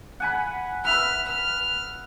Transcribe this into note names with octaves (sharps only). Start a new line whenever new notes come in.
F#5 G#5 B5
B4 E5 B5 F6
F6